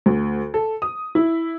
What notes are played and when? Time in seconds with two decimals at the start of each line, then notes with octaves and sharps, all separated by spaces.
0.06 D2
0.54 A4
0.82 D#6
1.15 E4